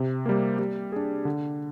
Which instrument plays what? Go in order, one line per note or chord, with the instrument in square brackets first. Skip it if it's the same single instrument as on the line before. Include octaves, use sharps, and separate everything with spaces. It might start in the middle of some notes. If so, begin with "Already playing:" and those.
Already playing: [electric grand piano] C3
G3 A#3
G3
D4 G#4
D3